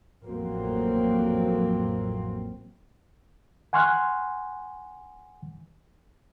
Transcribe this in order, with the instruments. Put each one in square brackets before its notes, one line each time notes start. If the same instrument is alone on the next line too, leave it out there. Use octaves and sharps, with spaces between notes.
[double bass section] A1 F2 F#3 A#3 C4
[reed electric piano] F#5 G#5 C6 C#6 F6 F#6